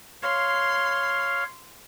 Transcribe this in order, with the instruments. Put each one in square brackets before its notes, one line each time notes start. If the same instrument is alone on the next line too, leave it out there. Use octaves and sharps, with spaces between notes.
[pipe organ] C#5 F5 [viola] C6